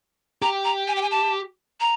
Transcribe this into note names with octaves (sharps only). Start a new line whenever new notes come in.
G4 A#5
A#5
G#5
G5
G#5
A5
A#5